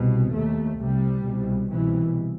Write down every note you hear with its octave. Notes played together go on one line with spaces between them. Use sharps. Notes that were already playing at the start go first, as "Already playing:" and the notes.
Already playing: C2 B2
D#2 A3
C2 C3 G3
C2 B2
C2 B2 E3